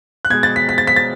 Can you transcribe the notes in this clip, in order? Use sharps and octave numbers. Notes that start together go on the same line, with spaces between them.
F#6
B2 G#3 G#6
A6
B6
B6
A6
B6
A6